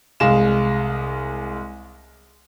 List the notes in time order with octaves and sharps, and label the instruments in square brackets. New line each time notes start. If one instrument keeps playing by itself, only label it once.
[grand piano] C2 G#3 F5 E7